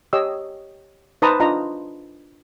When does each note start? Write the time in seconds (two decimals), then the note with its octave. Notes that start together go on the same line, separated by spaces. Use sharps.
0.13 G4 C#5 D#5 E6
1.22 D#4 B4 C5 A5 A#5 D#6
1.40 D4 F4 D#5 A#5